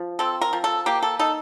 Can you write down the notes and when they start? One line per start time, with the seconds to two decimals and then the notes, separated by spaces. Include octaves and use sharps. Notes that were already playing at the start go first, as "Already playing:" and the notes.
Already playing: F3
0.19 C4 A4
0.41 A#4
0.53 F3
0.64 A4
0.86 A#3 G4
1.03 A4
1.19 D#4 A4